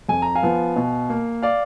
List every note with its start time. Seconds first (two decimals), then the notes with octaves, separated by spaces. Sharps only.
0.09 F2 G#5
0.22 A#5
0.35 F5 G#5
0.43 F3 B3
0.76 B2
1.09 A#3
1.43 D5 F5